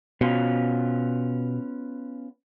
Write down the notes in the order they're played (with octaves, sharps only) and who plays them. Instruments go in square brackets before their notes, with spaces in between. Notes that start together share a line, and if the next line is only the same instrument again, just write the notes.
[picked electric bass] B2 [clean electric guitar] B3 C#4 F4